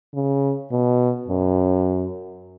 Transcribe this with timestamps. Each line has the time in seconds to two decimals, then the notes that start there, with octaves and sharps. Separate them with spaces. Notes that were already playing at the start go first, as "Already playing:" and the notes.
0.15 C#3
0.72 B2
1.28 F#2